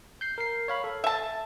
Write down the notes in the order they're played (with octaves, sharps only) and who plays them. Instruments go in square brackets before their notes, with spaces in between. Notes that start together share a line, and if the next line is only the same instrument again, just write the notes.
[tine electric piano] G6 C7
A#4 C7
C#5 F5 B5
A4
[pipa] E5 A5